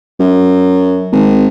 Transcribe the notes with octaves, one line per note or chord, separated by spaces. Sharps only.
F#2
G#1